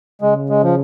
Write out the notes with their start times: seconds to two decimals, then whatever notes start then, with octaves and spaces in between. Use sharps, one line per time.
0.22 C#3 G#3
0.49 G#3
0.63 F3